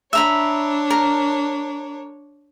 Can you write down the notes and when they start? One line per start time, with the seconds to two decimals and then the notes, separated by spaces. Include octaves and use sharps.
0.13 D4 C#5 E5 A#5 B5
0.90 A#4